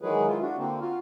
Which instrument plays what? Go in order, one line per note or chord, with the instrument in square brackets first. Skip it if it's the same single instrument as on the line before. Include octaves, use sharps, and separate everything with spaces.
[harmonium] D#3 E3 F#3 G#3 G#4 B4
E4 F4
D4 F#4
D3 A#3 C4
F4 F#4 F5